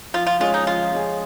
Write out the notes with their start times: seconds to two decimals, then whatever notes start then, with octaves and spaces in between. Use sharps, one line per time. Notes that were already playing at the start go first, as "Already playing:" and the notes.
0.14 F3 F4
0.27 F4
0.40 G#3 C#4 F4 G#4
0.54 D#4
0.66 F3 F4
0.93 G#3 C#4 G#4